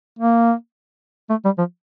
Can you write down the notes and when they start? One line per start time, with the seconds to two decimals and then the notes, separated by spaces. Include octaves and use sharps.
0.19 A#3
1.30 A3
1.45 G3
1.58 F3